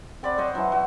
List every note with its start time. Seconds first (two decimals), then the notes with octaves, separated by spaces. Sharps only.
0.23 C4 D5 F#5 B5
0.38 C5 C#5 D#5 F#5
0.55 E3 F#3
0.72 F#3